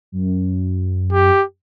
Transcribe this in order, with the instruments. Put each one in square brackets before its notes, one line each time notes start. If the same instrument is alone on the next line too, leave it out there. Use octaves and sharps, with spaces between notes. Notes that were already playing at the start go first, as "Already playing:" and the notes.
[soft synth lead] F#2
[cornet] G4